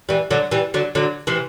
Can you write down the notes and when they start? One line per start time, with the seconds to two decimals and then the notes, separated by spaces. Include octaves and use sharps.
0.09 E3 G3
0.30 D3 F#3
0.51 E3 G3
0.74 D3 F#3
0.95 D3 F#3
1.27 C3 E3